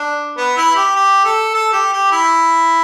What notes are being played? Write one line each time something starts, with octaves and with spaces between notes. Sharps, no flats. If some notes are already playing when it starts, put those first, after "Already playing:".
Already playing: D4
B3
E4
G4
G4
A4
A4
G4
G4
E4